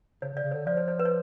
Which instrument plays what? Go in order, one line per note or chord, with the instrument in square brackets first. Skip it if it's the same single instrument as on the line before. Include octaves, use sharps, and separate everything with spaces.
[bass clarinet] C#3 [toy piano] C#5
[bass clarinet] C#3
[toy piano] D5
[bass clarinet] C#3
[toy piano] C#5
[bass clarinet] D3
[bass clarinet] F3 [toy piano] D5
[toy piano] C#5
C#5
B4
C#5